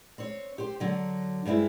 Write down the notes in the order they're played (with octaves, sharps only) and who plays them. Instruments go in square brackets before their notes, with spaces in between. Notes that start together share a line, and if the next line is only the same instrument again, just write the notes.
[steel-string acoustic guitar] C4 C#5
G4 C5
D3 F#3
G2 G#3 C4 E4